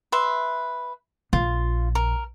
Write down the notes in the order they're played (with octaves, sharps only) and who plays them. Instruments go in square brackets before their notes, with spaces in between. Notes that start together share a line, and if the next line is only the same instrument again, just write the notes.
[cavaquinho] B4 E5 C6
[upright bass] A#1 [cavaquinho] F4
[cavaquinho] A#4